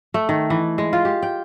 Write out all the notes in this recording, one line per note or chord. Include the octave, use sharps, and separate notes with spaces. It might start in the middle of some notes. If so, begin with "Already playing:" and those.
A3
D#3
E3
G#3
F4
G4
G5